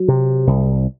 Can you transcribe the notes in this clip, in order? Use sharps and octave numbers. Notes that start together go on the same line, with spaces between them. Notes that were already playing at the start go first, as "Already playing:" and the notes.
Already playing: F#3
C3
C2